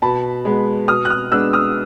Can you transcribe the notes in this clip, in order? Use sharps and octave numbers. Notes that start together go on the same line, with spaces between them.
B2 A5 B5
G#3 B3
B2 D#6 F6
F#6
D#6 F6
G#3 B3 D4 E6 F#6
D#6 F6